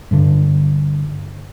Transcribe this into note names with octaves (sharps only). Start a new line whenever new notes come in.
G2 D3